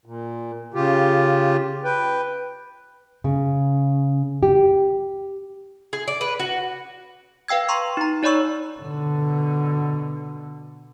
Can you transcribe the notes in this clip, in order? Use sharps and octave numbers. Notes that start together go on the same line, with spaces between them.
A#2
C#3 F4 G4
B4 G5
C#3
G4
G#4
D5
B4
F#4
B4 F5 G5 E6 G#6
A#5 C6 C#6
D#4 A#5
D#4 C#5 D5 B5 C#6 E6
B2 D3